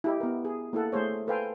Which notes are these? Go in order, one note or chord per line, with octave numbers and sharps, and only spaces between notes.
E4 G4 D#5
B3 A#4
G#4
A#3 E4 A4 F#5
A3 G#4 C5 C#5
A4 B4 C5 F5 G5 G#5